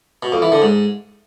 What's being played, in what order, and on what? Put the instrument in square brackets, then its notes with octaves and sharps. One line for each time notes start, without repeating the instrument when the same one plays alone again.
[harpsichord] B2
F2
E3
D3
G#2